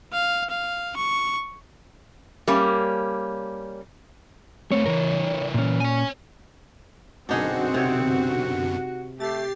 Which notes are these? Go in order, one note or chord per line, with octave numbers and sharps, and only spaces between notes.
F5
F5
C#6
G3 A#3 C#4
A3 C4 C#5
E3 A#4
A#2 C#4
C#5 G#5
F#2 B2 D3 C4 D4 D#4 F#4 G#4
C3 C#5
A3 G4 A6 C7